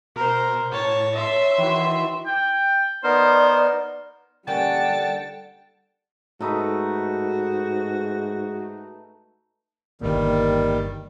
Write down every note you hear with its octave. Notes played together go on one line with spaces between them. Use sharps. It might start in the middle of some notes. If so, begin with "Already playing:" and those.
B2 A#4 C5
A2 C#5 A5
C#5 E5 C6
D#3 E3 E4 F#4
G5
B3 D#4 A#4 C5 D5
D3 G3 A#3 C#4 F#5 G5 A5
G#2 A3 D#4 F#4 B4
G1 G2 A#2 D#3 G3 A#3